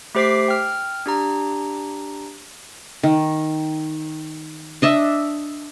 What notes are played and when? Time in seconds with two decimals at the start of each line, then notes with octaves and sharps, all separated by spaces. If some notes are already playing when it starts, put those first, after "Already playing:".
0.15 A3 G4 C5 D6 B6 C7
0.48 G5 F6
1.06 D4 G4 A#5
3.03 D#3
4.82 D4 D#5 E5